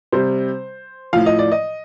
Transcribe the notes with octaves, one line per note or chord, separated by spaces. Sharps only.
C3 G3 C5
A2 F3 F5
D#5
D5
D#5